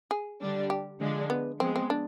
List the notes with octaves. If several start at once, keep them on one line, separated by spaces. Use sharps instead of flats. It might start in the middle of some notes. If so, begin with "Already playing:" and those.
G#4
D3 G3 D4
G4
D3 F3 G#3 D4
B3
F3 G#3 B3 C4
C4
D4